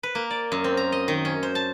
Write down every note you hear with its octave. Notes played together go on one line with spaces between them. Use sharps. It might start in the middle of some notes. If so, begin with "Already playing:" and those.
B4
A#3
D5
F#2
C4
A#5
D#5
D#3
C#4
C5
A5